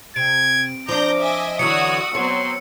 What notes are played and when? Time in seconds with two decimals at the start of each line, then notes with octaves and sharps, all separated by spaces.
0.16 C3 G#6 D7
0.88 F3 D4 A#5 D6 G6 A#6
1.21 D#5 E5 G#5
1.59 D3 E3 F#3 F#4 C#5 D#6 E6 C#7
2.15 F#3 B3 C4 C#5 C6